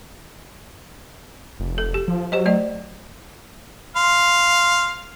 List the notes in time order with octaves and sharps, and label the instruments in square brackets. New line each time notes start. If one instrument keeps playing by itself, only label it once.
[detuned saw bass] F1
[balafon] A4
G4
[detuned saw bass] F3
[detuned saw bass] F#3 [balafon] G4 C5 D#5
[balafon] A3 D5 D#5
[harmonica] F5 C6